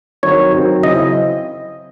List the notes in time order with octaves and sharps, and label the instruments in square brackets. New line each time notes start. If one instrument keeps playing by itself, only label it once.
[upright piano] D#3 F#3 C4 [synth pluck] C#5
[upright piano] D#3 F#3 C4
[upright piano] C#3 F#3 C4 E4 [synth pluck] D#5